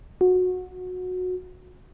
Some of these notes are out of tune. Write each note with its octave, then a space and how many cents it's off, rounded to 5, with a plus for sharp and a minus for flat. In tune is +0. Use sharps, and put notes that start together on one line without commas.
F#4 -20